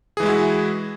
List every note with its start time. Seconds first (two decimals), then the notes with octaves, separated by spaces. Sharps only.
0.17 G#4
0.20 E3
0.23 G#3
0.26 E4
0.29 F#4